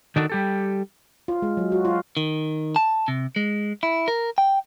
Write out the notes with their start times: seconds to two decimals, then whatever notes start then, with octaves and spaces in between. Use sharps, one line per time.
0.16 D#3 D4 D#4 F#4 A4
0.30 G3 G4 A4
1.28 F4
1.42 G#3
1.57 F#3
1.72 F#4
1.85 F4
2.17 D#3
2.76 A5
3.08 C3
3.36 G#3
3.83 E4
4.08 A#4
4.38 G5